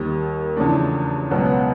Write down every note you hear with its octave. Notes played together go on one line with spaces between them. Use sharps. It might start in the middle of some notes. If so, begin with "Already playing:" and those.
Already playing: D#2 D#3 G3
E2 C#3 F3 A3 D4
C#2 B2 F#3 B3